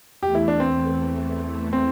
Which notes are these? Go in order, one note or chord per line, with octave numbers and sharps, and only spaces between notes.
E2 E3 A3 G4
E4
D4
C4
C4